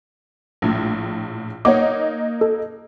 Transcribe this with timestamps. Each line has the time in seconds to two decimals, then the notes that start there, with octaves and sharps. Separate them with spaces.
0.62 A#1 A2
1.65 A#3 D#4 C#5 F#5 D6
2.41 A4